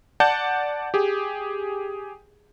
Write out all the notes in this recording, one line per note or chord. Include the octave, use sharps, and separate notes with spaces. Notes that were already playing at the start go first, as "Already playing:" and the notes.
D5 F#5 A5 G6
G4 G#4